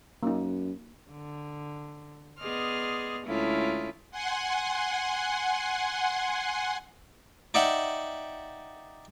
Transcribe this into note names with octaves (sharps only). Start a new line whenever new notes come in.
F#2 A#3 D#4
D3
B3 G#4 D5 D#5 C6 F6
D2 G#3 C#4 E4 F4
F#5 G#5 C6
D#4 D5 E5 F#5 G5